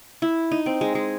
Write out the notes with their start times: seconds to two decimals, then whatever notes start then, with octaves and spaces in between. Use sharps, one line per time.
0.22 E4
0.52 D#4
0.66 C4
0.81 G#3
0.95 G#3